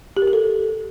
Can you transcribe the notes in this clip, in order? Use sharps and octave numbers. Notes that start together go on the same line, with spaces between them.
G4
A#4
G4
A4